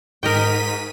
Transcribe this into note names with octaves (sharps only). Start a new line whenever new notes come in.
G#2 A#4 D#5 G5 B6 D#7